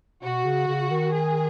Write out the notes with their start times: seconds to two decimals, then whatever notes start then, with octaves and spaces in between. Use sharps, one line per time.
0.23 B2 F#4
0.45 C#3
0.67 C#3
0.90 D#3
1.13 G#4